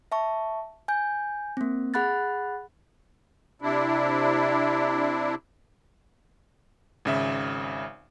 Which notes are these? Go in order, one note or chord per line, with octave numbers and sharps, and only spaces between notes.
E5 A5 C#6
G#5 G6
A#3 C4
G#4 F#5 B5 F#6 A6
C3 D4 E4
G#1 C#3 E5